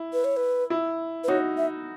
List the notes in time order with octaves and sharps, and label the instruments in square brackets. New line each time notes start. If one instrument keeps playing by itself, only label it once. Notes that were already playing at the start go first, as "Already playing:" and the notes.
Already playing: [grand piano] E4
[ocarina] B4
C#5
B4
[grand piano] E4
[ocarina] B4
[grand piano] D#4 F#4 [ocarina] C#5
[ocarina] E5